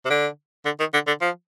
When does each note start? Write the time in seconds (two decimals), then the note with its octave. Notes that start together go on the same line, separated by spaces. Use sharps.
0.05 C3
0.10 D3
0.65 D3
0.79 D#3
0.94 D3
1.07 D3
1.21 F3